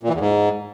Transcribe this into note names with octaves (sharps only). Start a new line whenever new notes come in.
A#2
E3
E2
G#2